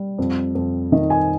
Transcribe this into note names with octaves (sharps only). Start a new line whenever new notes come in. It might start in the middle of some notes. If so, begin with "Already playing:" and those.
Already playing: G3
F2
F2
D#3 D#5
G#5